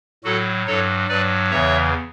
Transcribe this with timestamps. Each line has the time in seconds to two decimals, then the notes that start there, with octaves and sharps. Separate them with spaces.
0.24 A2 F#3 F#4 A4
0.66 G2 F#3 A4 C#5
1.09 G2 F#3 B4 D5
1.51 E2 C#3 E3 C#5 E5